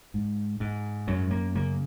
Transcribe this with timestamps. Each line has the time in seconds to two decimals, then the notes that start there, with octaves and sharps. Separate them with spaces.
0.14 G#2
0.60 G#2
1.08 F#2 F#3
1.31 A#3
1.55 C#3 A#3